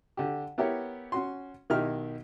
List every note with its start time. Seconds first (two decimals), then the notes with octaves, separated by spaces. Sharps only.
0.17 D3 G4
0.58 B3 E4 G4 A#4 C#5
1.12 C#4 F#4 C6
1.70 B1 D#3 D#4 E4 G4 F6